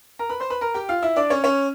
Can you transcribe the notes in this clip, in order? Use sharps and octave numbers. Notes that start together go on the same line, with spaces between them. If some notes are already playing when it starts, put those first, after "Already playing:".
A#4 A#5
B4 B5
C5 C6
B4 B5
A#4 A#5
G4 G5
F4 F5
E4 E5
D4 D5
C#4 C#5
C#4 C#5